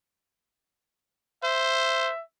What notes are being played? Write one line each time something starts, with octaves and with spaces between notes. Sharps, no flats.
C5 E5